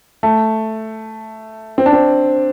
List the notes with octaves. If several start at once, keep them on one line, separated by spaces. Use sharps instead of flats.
A3
C4
D4
C4